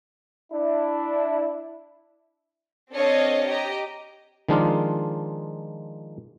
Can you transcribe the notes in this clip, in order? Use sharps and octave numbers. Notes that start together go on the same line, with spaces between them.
D4 E4
C4 D4 A4 C#5 D#5 F5
G4 D#5 A#5
D#3 F3 G#3 D4 D#4 F4